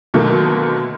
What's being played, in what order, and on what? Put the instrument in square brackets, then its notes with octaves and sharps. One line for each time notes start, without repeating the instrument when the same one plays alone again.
[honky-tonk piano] B2 D3 D#3 F#3 A3 A#3